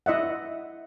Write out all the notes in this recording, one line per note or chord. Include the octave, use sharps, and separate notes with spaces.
E4 D#5 E5 F#5